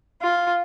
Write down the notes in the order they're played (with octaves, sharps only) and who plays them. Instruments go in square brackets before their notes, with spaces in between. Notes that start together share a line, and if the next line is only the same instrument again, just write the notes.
[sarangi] F4